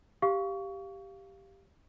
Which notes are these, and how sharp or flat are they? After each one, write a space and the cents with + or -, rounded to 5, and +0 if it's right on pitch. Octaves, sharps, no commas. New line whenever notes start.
G4 +0 F5 +0 C#6 +25